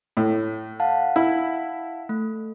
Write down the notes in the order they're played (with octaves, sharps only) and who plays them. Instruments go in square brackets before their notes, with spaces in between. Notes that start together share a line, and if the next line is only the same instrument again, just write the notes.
[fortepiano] A2
[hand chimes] F5 F#5 A5
[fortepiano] E4
[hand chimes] A3